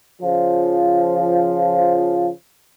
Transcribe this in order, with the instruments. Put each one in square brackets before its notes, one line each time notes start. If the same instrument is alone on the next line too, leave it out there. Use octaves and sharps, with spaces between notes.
[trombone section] C#3 F3